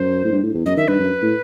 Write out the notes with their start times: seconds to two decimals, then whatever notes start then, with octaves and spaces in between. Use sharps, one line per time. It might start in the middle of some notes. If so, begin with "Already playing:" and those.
Already playing: F#2 C5
0.24 A2
0.32 G2
0.43 A2
0.54 E2
0.66 F#2 D#5
0.77 D#3 E5
0.88 G2 B4
0.99 F#2
1.22 A2